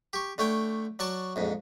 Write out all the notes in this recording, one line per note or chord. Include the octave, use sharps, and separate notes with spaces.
G4 C#6
D3 A3 C#5 G5
F#3 D5 A5 C#6
A#1 F2 G#2